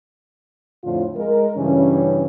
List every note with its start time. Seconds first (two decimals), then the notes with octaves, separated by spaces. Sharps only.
0.83 F2 A2 D3 F3 F4
1.16 G#3 A#4
1.56 G2 C#3 E3 C#4